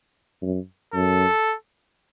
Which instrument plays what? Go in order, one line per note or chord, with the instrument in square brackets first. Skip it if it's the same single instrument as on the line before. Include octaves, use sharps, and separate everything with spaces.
[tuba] F#2
[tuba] F#2 [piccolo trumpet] A4